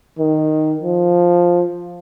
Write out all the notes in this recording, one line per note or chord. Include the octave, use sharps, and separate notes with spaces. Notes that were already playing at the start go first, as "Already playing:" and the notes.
D#3
F3